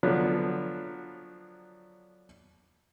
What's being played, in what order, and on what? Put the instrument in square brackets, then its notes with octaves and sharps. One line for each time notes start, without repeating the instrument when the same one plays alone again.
[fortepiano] D3 F3 F#3 B3